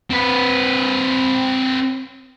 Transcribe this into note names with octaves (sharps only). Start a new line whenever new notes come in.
C4 B4